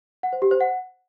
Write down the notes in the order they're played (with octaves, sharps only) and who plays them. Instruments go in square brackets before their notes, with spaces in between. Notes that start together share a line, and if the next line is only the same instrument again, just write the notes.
[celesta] F#5
C5
G4
C5
F#5